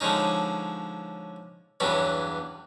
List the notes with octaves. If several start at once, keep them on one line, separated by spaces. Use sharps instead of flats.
D3 F3 G#3 C#4 D#4
E2 G2 F#3 B3 C#4